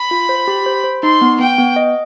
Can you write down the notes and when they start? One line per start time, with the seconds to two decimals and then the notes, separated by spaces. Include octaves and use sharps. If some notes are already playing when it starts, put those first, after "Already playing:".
Already playing: B5
0.11 F4
0.29 C5
0.48 G4
0.66 C5
0.84 C5
1.03 D#4 C6
1.21 B3
1.39 B3 G5
1.58 B3
1.76 D#5